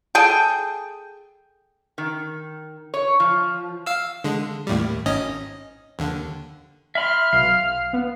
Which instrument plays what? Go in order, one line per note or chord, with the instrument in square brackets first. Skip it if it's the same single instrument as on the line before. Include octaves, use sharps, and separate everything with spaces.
[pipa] G#4 A4 G5
[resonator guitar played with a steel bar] D#3
C#5
F3
[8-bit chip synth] F5 E6
D3 G#3
D#2 A2 G3
G#1 C#4 D#5
D#2 D3
[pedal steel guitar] E5 B5 C6 [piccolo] F6
[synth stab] B1 [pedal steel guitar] F5
[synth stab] B3